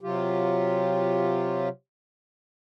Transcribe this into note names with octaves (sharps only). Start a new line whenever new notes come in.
C3 F#3 F4 G4